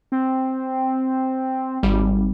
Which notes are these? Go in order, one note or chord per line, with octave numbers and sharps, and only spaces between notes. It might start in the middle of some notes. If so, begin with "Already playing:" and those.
C4
G#1 G3